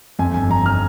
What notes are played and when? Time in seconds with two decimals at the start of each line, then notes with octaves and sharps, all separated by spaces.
0.19 F2 G#5
0.34 G1 G#5
0.50 F2 A#5
0.66 F6